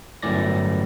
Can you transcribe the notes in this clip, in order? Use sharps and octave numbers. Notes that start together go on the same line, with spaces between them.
G1 F#2 A2 E3 D5 A#6